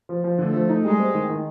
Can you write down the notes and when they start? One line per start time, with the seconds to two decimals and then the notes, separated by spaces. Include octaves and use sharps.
0.09 F3
0.24 F3
0.38 D3 A3
0.54 F3
0.69 D#4
0.84 G3 G#3
0.99 C4
1.14 D#3
1.29 D#3